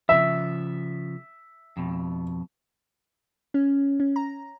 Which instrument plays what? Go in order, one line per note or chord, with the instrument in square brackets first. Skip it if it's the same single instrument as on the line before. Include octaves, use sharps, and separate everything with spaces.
[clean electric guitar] C#3 F3 [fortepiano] E5
[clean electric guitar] F2 B2
[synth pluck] C#4
C#4
A#5